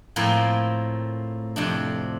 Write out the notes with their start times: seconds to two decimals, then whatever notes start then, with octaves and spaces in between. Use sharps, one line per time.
0.16 A2 F3 A#3 C4 G#5
1.56 F2 C3 D4